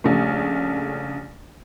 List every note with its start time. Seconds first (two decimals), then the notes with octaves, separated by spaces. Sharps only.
0.04 A#1 C#3 G3 A3